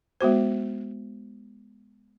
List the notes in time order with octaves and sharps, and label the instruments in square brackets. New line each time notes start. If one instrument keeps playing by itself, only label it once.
[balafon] G#3 B3 F#4 C5